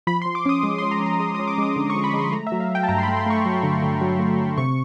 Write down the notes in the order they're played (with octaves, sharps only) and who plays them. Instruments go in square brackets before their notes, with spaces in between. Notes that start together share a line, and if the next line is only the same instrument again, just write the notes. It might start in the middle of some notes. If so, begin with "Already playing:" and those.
[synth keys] F3 B5
F3 C6
D6
C#4 D#6
G#3 D6
C#4 C6
A#5
C#4
A#5
G#3 D#6
C#4 D#6
D6
G#3 D#6
D3 D6
C#6
F3
B5
G#3
C6
A3 A#5
E5
F#3
F5
F#3
G5
A5
G2 A#5
C6
B5
A3
C6
A3 C#6
F#3
D3
D3
F#3
A3
F#3
C3 C#6